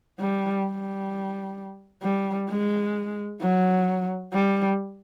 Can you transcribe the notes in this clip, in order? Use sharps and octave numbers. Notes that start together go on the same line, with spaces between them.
G3
G3
G3
G#3
F#3
G3